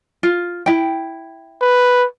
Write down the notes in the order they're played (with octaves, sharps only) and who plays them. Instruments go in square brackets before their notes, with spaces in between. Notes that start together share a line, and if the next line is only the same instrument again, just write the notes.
[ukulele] F4
E4 G5
[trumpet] B4